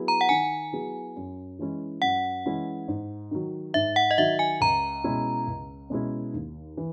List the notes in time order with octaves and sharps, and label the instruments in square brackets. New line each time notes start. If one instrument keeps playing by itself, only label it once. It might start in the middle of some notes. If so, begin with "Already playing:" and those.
Already playing: [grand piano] F#3 B3 E4 G#4
[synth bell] A#5
F#5
[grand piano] D#3 [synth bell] G#5
[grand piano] F#3 B3 E4 G#4
F#2
E3 G#3 C#4 E4
[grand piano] F#2 [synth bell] F#5
[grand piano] E3 G#3 C#4 E4
G#2
D#3 F#3
[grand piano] G#2 [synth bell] E5
[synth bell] F#5
D#5
[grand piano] D#3 F#3 [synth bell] E5
[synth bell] G#5
[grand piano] C#2 [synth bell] A#5
[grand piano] B2 G#3 C#4 E4
C#2
B2 G#3 C#4 E4
D#2
E3